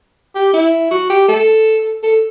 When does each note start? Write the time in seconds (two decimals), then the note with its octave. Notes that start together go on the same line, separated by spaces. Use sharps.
0.35 G4
0.53 E4
0.91 F#4
1.10 G4
1.28 A4
2.03 A4